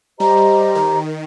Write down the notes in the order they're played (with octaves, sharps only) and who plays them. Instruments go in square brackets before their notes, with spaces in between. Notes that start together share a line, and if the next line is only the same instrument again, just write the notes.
[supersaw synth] G3 [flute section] G4 C5 D#5 A#5
[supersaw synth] D#3